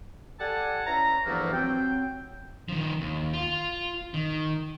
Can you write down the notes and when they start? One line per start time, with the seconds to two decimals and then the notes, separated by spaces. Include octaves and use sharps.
0.40 G4 A4 D5 F#5 G#5 A5
0.86 C#4 E4 B4 A#5
1.26 E2 G2 E3 F3 A3 A#3
1.53 F#3 C4 G5
2.69 D#3 F3
3.01 D#2
3.33 F4
4.14 D#3